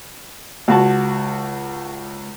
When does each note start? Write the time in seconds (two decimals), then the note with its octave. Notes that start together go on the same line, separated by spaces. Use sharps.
0.68 C#2 F#4 A5